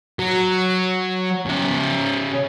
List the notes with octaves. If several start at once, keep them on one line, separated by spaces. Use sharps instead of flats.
F#3
C#3 E5